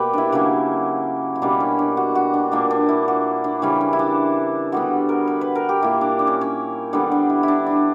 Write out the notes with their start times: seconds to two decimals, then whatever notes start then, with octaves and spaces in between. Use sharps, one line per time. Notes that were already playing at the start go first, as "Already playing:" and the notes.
Already playing: B2 A#3 G4 B4
0.13 D4 E4
0.32 C#3 F#3 A#3
1.36 E4
1.42 B2 G3 A#3 D4
1.60 C#4
1.79 D4
1.97 F#4
2.15 F#4
2.34 D4
2.52 A#2 A#3 D4
2.71 D4
2.89 E4
3.08 F#4
3.44 D4
3.62 C#3 E3 G3 C#4
3.81 D4
3.93 E4
3.99 D4
4.72 D3 G3 B3 F#4
5.09 A#4
5.28 B4
5.41 B4
5.56 A#4
5.69 G4
5.82 A#2 A#3 E4
6.01 D4
6.19 D4
6.27 C#4
6.41 C#4
6.93 D3 G3 B3 D4
7.12 D4
7.30 E4
7.43 D4 E4
7.66 D4